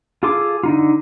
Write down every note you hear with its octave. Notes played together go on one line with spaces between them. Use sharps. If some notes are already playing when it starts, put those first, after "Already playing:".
F4 G#4 A4 C6 D6
D3 D#4 F4